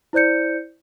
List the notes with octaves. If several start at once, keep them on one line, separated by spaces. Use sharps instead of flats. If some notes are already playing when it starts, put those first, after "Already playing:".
E4 C5 D5 G6 C#7